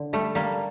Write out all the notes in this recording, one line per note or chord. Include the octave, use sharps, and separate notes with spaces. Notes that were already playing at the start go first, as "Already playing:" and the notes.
Already playing: D3
G3 A3
G3 A#3